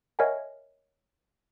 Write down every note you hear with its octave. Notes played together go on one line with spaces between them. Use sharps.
A#4 C#5 D#5 E5 F#5 G#5